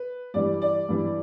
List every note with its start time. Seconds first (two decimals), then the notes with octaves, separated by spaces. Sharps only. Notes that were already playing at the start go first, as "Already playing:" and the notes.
Already playing: B4
0.34 G2 E3 G3 D5
0.62 D5
0.89 G2 E3 G3